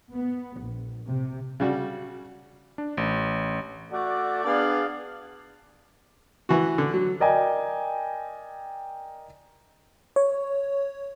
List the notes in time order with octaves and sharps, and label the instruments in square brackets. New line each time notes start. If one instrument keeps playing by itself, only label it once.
[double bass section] B3
A#1
C3
[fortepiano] C#3 G3 F#4
[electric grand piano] D4
A1
[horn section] A3 F#4 A4 D5
B3 D4 G#4 D5 F5
[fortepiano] E3 F#4
D3
F#3
[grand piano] A#4 D5 D#5 G5 G#5
[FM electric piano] C#5